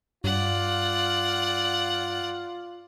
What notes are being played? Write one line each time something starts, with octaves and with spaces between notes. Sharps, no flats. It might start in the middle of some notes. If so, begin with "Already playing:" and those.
G2 F4 D5 F#5